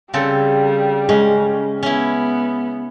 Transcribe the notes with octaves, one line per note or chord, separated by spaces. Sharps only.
C#3 G3 C4 A4
G#3 C#4
B3 C#4 E4